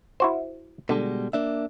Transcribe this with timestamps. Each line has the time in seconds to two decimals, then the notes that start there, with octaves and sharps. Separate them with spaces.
0.20 E4 F#4 C5
0.89 B2 D3 G3 G#3
1.33 A#3 D4 E5